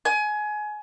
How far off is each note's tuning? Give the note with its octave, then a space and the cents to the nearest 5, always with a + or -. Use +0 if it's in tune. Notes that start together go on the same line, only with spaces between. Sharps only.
G#5 +25